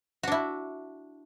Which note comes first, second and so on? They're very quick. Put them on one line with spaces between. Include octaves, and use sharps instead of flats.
F#4 D4 E4